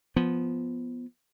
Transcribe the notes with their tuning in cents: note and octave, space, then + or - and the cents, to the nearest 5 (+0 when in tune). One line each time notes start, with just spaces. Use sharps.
F3 +0 B3 +0